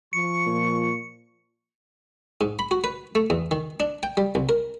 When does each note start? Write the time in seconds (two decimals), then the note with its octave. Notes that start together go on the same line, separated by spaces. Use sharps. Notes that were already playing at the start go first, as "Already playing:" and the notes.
0.13 F3 C#6 C#7
0.46 A#2
2.41 G#2
2.59 B5
2.71 F#4
2.84 B4
3.15 A3
3.30 E2
3.51 D#3
3.80 D4
4.03 G5
4.17 G3
4.35 C2
4.49 A#4